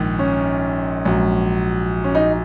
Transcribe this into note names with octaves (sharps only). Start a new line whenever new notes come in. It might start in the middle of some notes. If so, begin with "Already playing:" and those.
Already playing: A#1 G#2 D#3
C#4
A#1 G#2 F#3
C#4
D#4